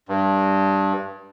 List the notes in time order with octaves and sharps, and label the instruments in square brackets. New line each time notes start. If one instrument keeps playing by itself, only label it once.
[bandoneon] G2